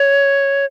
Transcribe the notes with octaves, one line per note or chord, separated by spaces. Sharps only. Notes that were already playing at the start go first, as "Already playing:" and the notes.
Already playing: C#5